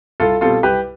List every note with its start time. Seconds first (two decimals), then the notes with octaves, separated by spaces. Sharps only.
0.20 C2 F4 A4
0.41 B2 G3 C4 F4 A4
0.63 C2 G4 B4